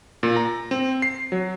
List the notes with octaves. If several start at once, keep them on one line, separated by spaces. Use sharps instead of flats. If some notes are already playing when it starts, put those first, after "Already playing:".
A#2
A#5
C4
C7
F#3